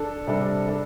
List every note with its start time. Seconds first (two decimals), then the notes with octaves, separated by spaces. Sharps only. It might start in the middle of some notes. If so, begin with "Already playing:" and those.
Already playing: D4 A4
0.27 C3 G3 D4 A4
0.68 D4 A4